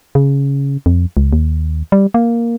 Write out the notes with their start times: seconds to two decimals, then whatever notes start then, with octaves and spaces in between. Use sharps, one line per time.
0.15 C#3
0.86 F2
1.17 C#2
1.33 D#2
1.92 G3
2.14 A#3